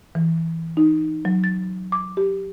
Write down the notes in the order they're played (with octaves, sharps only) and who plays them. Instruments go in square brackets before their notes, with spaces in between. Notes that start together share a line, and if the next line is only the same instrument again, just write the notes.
[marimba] E3
D#4
F#3
A6
D6
G4